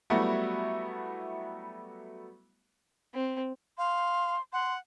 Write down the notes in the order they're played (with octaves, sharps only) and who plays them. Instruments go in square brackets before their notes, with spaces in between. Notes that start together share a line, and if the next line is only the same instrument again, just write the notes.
[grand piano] F#3 G3 A3 B3 E4 F#4
[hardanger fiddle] C4
[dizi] F5 [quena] C6
[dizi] F#5 [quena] C6